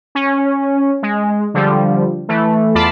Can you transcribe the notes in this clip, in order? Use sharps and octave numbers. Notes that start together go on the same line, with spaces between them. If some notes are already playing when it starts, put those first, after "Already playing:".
C#4
G#3
D3 F3 G3
E3 A3
E2 F4 A5 B5 D6 C7